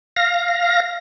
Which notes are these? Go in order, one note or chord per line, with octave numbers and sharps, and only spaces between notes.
F5 A#6